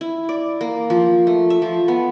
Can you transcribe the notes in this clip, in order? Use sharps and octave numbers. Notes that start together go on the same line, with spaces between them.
E4
D5
A#3
F3
A3
E5
F3
B3